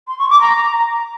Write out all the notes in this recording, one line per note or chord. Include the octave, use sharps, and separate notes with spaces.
C6
C#6
D6
A#5